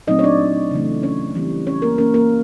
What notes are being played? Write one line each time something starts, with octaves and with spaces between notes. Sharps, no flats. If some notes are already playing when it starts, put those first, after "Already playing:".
A#2 F#3 A3 C4 D#4 D#5
C#5
D4 D5
C#3 E3 A3
C#4 C#5
E3 G3 C4
C#4 C#5
A#3 A#4
E3 G3 A#3 C#4 A#4
A#3 A#4